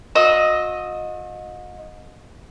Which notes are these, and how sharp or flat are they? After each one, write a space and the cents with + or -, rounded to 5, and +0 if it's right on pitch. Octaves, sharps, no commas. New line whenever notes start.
F#4 -45 D#5 +0 E6 -25